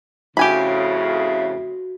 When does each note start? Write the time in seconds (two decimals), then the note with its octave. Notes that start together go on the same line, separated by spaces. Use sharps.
0.37 F2 A2 C#3 F#4 G4 E5 G#5 B5